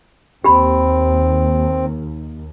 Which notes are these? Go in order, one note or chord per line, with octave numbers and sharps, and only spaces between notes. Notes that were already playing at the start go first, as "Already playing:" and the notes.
D#2 C4 G4 B5